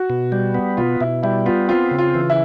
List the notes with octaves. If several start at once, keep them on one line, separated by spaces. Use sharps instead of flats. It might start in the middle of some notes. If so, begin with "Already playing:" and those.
Already playing: F#4
B2
G3
B3
B2 F4
B2 E4
G3 E4
B3 F4
C4 F4
C#3
F4
E3
E4